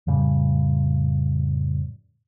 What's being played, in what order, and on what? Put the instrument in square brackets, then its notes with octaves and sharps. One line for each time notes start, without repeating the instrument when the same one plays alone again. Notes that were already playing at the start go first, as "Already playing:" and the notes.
[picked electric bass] F2 A2 C#3 G3